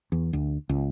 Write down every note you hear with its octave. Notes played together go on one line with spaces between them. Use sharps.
E2
D2
C#2